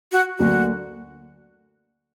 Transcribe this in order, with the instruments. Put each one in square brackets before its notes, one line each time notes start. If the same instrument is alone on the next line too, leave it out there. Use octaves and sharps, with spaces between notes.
[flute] F#4
[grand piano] D2 D3 F#3 A#3 [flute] F#4